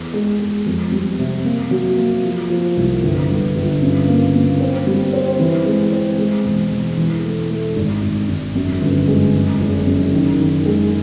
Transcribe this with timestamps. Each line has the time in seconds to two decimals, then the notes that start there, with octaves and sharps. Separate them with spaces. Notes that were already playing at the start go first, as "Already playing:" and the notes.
Already playing: E2
0.14 G#3
0.40 G#3
0.66 F2
0.92 G3
1.18 C3
1.45 A#3
1.71 F#3
1.97 A#3
2.24 F3
2.50 F3
2.77 C2
3.03 G1
3.29 G1
3.56 G1
3.82 C#3
4.08 A#3
4.34 A#3
4.60 C4
4.87 G3
5.13 C4
5.40 E3
5.66 G#3
5.92 C4
6.18 G#3
6.45 E1
6.71 E1
6.97 E3
7.24 A3
7.50 A3
7.76 G#1
8.03 G#1
8.29 G#1
8.55 F#2
8.82 G1
9.08 G#3
9.34 F#2
9.60 F#1
9.87 F#2
10.13 D#3
10.40 D#3
10.66 G#3